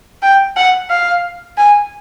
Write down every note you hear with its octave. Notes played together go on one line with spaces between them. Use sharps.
G5
F#5
F5
G#5